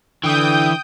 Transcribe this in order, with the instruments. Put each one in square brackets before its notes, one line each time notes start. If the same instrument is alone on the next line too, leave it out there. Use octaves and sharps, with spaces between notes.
[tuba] D3 [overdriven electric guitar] E3 [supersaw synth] G5 D#6 G6